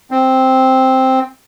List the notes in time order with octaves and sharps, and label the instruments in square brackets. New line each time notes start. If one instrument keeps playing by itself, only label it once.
[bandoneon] C4